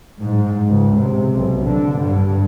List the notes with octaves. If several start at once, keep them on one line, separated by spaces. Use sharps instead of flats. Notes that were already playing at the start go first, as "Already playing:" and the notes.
G#2
C#2
C3
B1
D3
G2